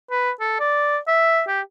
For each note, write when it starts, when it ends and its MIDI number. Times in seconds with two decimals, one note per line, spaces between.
0.11 0.31 71
0.40 0.56 69
0.60 0.98 74
1.08 1.42 76
1.48 1.61 67